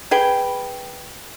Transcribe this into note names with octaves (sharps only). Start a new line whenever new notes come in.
G#4 B4 G5